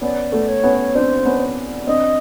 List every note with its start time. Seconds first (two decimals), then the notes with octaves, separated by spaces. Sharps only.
0.01 B3 C#4 D5
0.32 A3 B3
0.48 C#5
0.64 B3 C#4
0.95 C4 D4 C5
1.25 B3 C#4
1.87 C4 D4 D#5